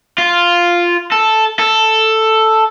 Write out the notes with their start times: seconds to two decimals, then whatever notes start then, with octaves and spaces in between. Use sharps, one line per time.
0.18 F4
1.12 A4
1.59 A4